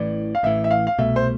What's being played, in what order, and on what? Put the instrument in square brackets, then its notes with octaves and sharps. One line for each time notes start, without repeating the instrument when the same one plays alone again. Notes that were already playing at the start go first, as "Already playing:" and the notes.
Already playing: [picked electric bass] A1 A2 E3 [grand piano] D5
[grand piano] F5
[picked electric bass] A1 A2 E3 [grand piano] E5
[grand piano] E5
F5
F5
[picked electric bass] C2 B2 A3 [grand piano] E5
[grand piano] C5